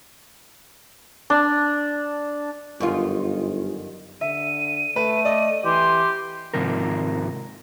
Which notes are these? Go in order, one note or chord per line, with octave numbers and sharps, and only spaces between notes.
D4
G1 F#2 D#3 F4
D3 E5 D#7
A3 B4
D5 D#5
E3 G4 C6
G#2 C3 D#3 F3 A#4